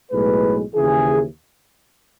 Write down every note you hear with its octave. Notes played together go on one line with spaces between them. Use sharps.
B1 A2 G#3 B4
D#2 C#3 E3 G#4